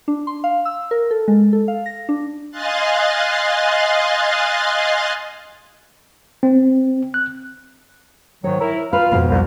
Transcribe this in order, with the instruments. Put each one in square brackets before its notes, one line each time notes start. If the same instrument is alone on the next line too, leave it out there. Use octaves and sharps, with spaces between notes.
[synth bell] D4
C6
F5
E6
A#4
A4
G#3
A4
F5
A#6
D4
[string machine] D#5 F5 G#5 C6 F#6 A6
[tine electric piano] C4
F#6
[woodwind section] G#2 D#3 F#3 [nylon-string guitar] C#5
[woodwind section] E4 A#4
[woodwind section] F4 F5 [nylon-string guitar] B4
[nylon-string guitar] F2 G#2 B2
[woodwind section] C2